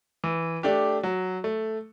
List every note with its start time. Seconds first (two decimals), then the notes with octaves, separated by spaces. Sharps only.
0.24 E3
0.63 A3 D4 G4
1.03 F#3
1.44 A3